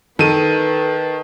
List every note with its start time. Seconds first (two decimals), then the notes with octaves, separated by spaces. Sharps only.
0.19 D#3 A4 B4 D#7